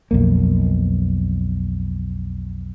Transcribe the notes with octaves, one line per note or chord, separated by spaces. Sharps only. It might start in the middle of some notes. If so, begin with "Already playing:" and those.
B1 F2 A#3